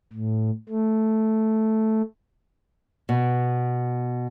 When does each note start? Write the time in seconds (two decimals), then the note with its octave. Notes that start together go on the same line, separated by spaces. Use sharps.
0.13 A2
0.69 A3
3.09 B2